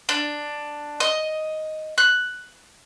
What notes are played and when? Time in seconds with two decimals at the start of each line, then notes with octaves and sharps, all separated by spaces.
0.09 D4
1.00 D#5
1.98 F#6